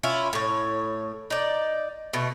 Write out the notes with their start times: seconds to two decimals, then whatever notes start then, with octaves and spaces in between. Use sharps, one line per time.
0.03 C#4 E4 F4
0.33 A2 C#5
1.30 D#4 D5
2.13 B2 A3